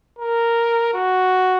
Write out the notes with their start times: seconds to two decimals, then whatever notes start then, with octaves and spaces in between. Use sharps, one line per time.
0.19 A#4
0.94 F#4